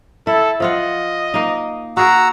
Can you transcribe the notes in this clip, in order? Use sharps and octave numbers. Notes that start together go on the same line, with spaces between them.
E4 A4
F3 F4 D#5 F#5
A#3 D#4
F#4 G#4 A#4 F#5 A#5 E6